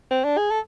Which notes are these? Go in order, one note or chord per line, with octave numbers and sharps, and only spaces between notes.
C4
D4
G#4
A4